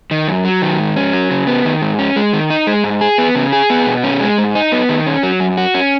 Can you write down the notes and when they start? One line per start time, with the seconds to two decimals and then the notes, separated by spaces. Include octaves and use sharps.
0.11 D#3
0.28 F#2
0.45 F#3
0.62 D#3
0.79 G#2
0.96 C#4
1.13 F#3
1.31 C#3
1.47 B3
1.65 D#3
1.82 G#2
1.99 C#4
2.16 G#3
2.33 D#3
2.50 D#4
2.67 G#3
2.84 G#2
3.01 G#4
3.18 B3
3.35 C#3
3.52 G#4
3.70 B3
3.86 B2
4.03 C#4
4.20 G#3
4.38 G#2
4.55 D#4
4.72 B3
4.89 D#3
5.06 C#4
5.23 F#3
5.40 F#2
5.57 F#4
5.74 C#4